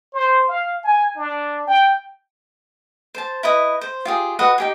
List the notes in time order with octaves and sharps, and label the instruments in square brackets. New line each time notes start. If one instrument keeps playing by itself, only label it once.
[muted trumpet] C5
F5
G#5
D4
G5
[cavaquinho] C5 A5
E4 B4 D#5
C5
F4 G4 G#4
F#4 B4 D#5 F#5
D#4 G4 G#4